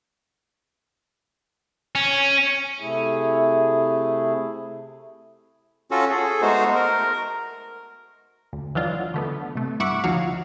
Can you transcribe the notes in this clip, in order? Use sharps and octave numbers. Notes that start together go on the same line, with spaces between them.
C#4
C3 A3 E4 G#4
C#4 F4 F#4 A4
G#4 A4
G#3 A3 B3 D#4 F#4 C5
A#4
D2
E3 F#3 D4 D#4 F4
D3 A3 B3
C3 A3
G2 E4 E5 F#5 C#6 D6
D2 F3 D#4 F#4 C#5 F5